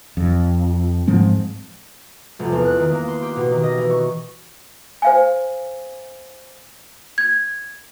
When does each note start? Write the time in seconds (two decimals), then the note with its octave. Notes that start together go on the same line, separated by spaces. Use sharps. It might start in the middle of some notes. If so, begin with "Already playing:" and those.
0.17 F2
1.07 G#2 F3 G#3 C4
2.39 F1
2.52 E2
2.65 F#6
2.79 D#3
2.92 A#3
3.08 C6
3.22 G4
3.36 B2
3.52 D#3
3.63 D#5
3.78 E3
3.90 C#6
5.02 C5 F5 G#5
7.18 G#6